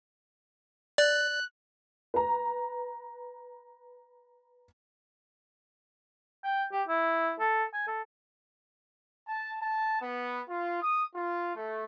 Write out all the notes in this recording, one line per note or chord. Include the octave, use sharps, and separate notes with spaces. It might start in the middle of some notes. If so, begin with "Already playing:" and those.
D5 F#6
B4 A#5
G5
G4
E4
A4
G#5
A4
A5
A5
B3
F4
D#6
F4
A3